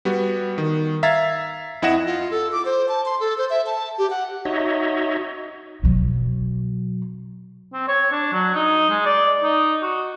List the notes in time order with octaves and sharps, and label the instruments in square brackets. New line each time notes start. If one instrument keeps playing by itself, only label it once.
[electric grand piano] G3 B3 F#4
D#3
E5 F5 A#5 G#6 A6
F2 E4 D#5 F#5 A#6 E7
[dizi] F4
A4
D6
C5
A5
C6
A4
C5
E5
A5
G4
F#5
[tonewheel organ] D#4 F#4 C#5 D#5 E5
[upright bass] B2 F#3
[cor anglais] C4
C#5
D4
F#3
D#4
G#3
D5
D#4
F#4